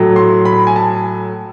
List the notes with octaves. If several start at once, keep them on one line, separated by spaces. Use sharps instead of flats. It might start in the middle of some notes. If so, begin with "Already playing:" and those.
Already playing: A2 F#3 A3
C6
B5
G#5
A5